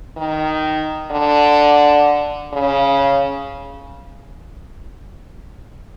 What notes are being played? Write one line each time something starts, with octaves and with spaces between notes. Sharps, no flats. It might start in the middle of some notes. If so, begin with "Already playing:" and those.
D#3
D3
C#3